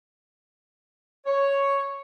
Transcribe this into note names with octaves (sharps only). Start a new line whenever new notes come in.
C#5